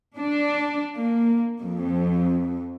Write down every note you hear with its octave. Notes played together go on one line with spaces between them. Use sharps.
D4
A#3
F2